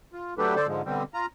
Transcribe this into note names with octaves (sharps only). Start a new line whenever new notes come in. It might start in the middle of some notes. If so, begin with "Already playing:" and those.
F4
F#3 A3 D4 G4 A4 B4
D3 A4 C5 D5
G#2 D3 F3 G#3
B2 D3 G3 C4
F4 A#5